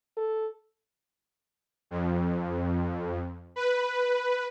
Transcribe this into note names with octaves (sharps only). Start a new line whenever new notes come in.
A4
F2
B4